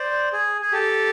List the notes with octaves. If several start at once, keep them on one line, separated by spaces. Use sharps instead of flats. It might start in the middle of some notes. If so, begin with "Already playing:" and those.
Already playing: C5 D5
G#4
G#4
G4 A4